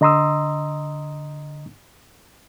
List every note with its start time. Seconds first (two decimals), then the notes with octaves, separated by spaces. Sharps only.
0.01 D3 D#5 A#5 C6 D#6 E6